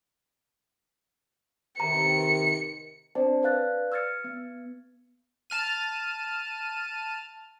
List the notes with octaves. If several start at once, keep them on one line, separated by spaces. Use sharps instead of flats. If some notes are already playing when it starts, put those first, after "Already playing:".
C3 D#3 A#5 C#7
C4 D4 C5 D5 A5
B4 D5 F5 F#6 A6
E6 F6 G#6 A6 C#7
B3
A5 F6 D#7